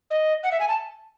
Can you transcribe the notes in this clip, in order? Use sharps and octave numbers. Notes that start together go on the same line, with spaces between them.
D#5
F#5
E5
G#5
A5